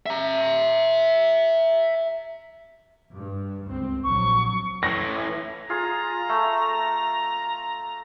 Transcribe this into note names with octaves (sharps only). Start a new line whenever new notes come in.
E5 A#5
G2
C#2 C4
A#1 F#3 C#6
A2 E3 A#6
F4 G#4 A#5
A3